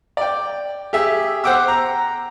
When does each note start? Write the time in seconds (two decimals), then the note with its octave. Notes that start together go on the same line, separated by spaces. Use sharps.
0.17 D5 G5
0.93 G4 G#4 E5
1.44 C5 F#5 G5 D6 E6
1.68 A#5